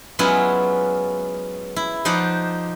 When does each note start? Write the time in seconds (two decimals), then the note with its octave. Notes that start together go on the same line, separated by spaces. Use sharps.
0.19 F#3 G#3 B3 C#4 E4 F4
1.76 E4
2.05 F3 D#4 C5 D5 F#5